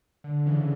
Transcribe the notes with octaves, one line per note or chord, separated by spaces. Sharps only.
D3
C#3 E3